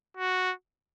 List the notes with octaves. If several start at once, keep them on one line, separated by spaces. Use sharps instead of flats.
F#4